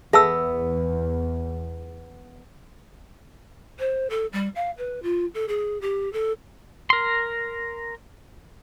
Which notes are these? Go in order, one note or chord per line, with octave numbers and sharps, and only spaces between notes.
E2 B3 G#4 A4 E5 A5 E6
C5
A4
G3
F5
B4
F4
A4
G#4
G4
A4
A#4 C6